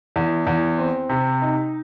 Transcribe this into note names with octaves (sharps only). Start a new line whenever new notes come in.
E2
E2
C4
C3
D#4